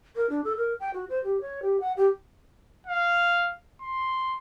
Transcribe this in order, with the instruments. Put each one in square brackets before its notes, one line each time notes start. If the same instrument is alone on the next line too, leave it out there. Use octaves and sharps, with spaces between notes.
[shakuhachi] A#4
D4
A4
A#4
G5
F#4
C5
G4
C#5
G4
F#5
G4
[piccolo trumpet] F5
C6